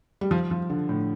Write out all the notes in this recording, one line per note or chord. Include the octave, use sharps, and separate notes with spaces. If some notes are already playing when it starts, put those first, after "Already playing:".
G3
F3
F3
D3
A2